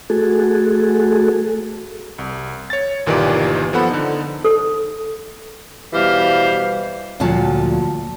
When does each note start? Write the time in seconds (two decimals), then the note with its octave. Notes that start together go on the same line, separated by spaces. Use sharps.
0.10 A3 F#4 G#4 A4
2.19 C2
2.70 C#5 A6
3.06 G1 A#2 D#3 E3 G4 D5
3.73 F3 B3 A4 F#5 B5
3.91 D3 D#4
4.45 A4
5.93 B2 E3 G3 G4 C5 F5
7.20 D2 A#2 F3 F#3 A5